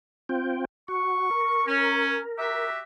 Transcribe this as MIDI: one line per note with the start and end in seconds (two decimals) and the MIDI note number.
0.29 0.65 60
0.29 0.65 65
0.29 0.65 79
0.88 1.30 66
0.88 1.62 85
1.31 2.70 70
1.66 2.17 61
2.39 2.80 66
2.39 2.80 67
2.39 2.80 76